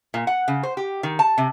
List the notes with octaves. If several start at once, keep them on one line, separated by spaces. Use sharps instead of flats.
A#2
F#5
C#3
C5
G4
D#3
A5
C3